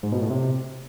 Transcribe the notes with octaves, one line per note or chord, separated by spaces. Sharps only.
G#2
B2
A2
C3